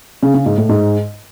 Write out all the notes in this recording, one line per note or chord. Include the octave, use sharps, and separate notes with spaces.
C#3
C#3
G#2
A2
G#2